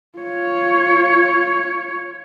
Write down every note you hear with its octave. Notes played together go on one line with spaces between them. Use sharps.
F4 C#5